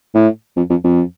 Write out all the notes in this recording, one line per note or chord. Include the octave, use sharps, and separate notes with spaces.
A2
F2
F2
F2